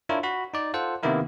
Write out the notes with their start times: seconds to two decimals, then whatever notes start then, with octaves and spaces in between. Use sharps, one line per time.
0.09 D4 E4 F4 A#4 C#5
0.23 F#4 B5
0.54 D#4 D5
0.74 F4 A4 C5 F#5
1.03 C3 D#3 A#3 B3 E4 A#4